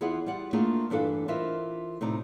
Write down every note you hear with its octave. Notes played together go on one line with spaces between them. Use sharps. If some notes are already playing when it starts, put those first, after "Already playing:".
E2 E4 F4 G#4 E5 F#5
G3 F4 D5 F#5
A3 A#3 D4 E4 F4 G#4
G2 E3 D4 A4 F5
E3 F4 A#4 C5 D#5 E5
A2 C3 G3 D#4 D5